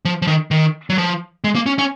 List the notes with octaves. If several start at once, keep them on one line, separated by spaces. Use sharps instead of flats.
F3
F3
D#3
D#3
F#3
F3
G#3
A#3
C#4
C#4